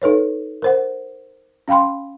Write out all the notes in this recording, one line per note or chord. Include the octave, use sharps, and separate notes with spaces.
D#4 A4 B4 C#5
A#4 C5 F#5
C#4 F5 G5 B5 C6